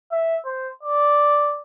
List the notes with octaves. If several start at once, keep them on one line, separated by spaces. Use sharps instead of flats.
E5
C5
D5